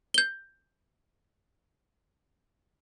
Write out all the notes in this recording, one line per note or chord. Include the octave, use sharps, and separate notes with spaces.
G6 G7